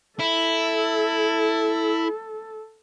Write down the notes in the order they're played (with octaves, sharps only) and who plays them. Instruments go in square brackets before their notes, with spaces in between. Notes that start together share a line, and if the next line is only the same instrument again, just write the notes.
[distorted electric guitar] E4 [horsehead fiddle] A4